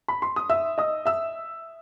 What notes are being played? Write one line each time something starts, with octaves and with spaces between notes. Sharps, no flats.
B5
C6
D#6
E5 E6
D#5 D#6
E5 E6